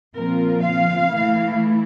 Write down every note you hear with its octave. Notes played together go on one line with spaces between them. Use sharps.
A#2 F3 C4 F4 A#4
F5
E3 A3 E4